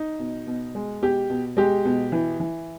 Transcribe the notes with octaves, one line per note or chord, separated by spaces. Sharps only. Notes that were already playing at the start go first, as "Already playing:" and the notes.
Already playing: D#4
B2
B2
G#3
B2 G4
B2
G#3 G4
B2
E3
E3